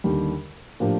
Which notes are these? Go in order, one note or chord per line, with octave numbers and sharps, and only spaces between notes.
D#2 D3 G3
A2 F3 A#3 D4 G4